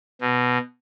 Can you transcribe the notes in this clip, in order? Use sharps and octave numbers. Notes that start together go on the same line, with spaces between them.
B2